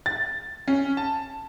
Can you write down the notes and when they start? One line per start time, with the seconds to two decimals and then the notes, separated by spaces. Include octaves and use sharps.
0.06 A6
0.68 C#4
0.97 A5